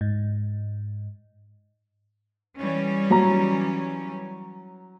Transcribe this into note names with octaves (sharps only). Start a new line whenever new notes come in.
G#2
E3 G3 C#4
F#3 A#5